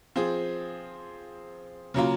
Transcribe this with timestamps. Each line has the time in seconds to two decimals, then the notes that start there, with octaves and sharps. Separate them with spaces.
0.16 F3 C4 F4 G#4
1.94 C#3 F#3 A#3 F4